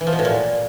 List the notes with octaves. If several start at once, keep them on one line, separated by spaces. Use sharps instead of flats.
E3
F3
B2
A2
A#2